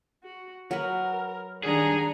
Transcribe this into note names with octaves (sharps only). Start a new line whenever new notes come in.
F#4
F#3 A#4 B4
D#3 G3 D4 G#4 F#5 A#5